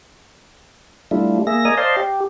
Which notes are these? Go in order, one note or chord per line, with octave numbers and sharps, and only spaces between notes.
G3 A3 D4 E4 F4
A#3 G#4 E5 A#6
A#4 D5 D#5 G#5 A#5 D#6
C5 D5 D#5 F5 A5 C6
G4